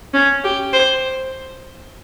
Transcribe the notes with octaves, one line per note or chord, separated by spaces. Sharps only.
C#4
G4
C5